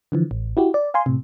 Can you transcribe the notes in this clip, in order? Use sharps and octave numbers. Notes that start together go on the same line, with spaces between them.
D3 E3 F3
A1
E4 F#4 G4
D5
F5 G#5 C6
A2 C3